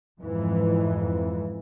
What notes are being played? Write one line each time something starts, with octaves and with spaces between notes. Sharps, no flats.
F2 G#2 E3